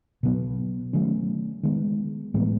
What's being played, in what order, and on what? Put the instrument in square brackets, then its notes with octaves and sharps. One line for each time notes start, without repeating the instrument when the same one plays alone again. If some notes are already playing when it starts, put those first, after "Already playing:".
[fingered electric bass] B2 F#3 B3
D#3 F#3 A3 C#4
D#3 G#3 B3
A2 E3 G#3 B3